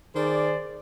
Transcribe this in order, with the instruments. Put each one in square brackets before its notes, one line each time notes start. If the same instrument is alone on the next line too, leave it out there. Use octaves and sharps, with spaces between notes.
[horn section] D#3 G#4 C5 D5